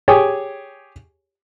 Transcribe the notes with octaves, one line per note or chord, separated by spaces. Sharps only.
G4 G#4 C#5 G5 G#5